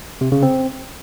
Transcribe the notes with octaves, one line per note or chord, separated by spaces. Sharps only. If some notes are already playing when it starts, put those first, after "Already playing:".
C3
C#3
C4